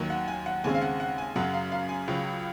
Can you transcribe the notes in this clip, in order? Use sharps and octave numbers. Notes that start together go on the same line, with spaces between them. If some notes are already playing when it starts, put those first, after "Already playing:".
Already playing: D#2 D#3 F#3
F#5
G#5
F#5
D#2 C#3 G#3 C4 G#5
F5
F#5
F#5
G#5
F#2 C#3 F#3 C#4 F#5
F5
F5
G#5
C#2 C#3 F#3 C#4